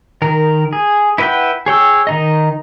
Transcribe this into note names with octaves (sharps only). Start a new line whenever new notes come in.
D#3 A#4
G#4
E4 B4 D#5 F#5 G5
G#4 C#5 G5 E6
D#3 D#4 D#5